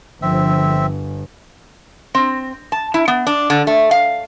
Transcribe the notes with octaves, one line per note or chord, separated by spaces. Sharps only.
G1 D3 F3 C4 E5
C4
A5
E4
B3
D4
D3
A3
F5